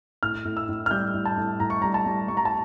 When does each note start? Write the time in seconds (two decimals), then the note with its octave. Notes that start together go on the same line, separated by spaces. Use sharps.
0.23 A2 F6
0.45 A2
0.57 E6
0.69 A2
0.86 F6
0.91 G3 G6
1.14 A2
1.25 A5
1.38 A2
1.60 A2 A#5
1.70 C#6
1.82 G3 A#5
1.94 A5
2.06 G3
2.28 G3 C#6
2.37 A#5
2.45 A5